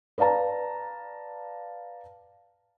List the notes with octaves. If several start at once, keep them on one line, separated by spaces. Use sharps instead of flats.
B4 D5 F5 A5 A#5